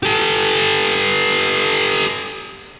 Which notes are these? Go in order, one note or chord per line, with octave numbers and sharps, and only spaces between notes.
G4 A4